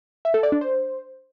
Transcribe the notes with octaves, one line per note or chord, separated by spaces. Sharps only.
E5
A4
D5
D4
C5